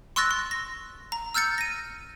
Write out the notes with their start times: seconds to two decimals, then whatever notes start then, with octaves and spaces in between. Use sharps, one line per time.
0.16 C6 C#6 E6 F#6 A6 A#6
0.31 C6
0.51 A#6
1.12 A#5
1.34 E6 F6 G6 A6 C#7
1.58 A#6 D#7